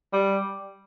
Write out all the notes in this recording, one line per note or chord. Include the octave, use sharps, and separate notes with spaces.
G3